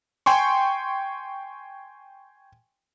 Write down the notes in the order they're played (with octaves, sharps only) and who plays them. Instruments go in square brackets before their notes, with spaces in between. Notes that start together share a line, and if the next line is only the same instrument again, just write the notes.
[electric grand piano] G5 G#5 C6 C#6